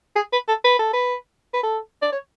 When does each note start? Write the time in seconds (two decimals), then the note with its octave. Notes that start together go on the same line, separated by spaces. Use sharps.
0.16 G#4
0.33 B4
0.49 A4
0.64 B4
0.79 A4
0.93 B4
1.54 B4
1.63 A4
2.02 D5
2.12 C#5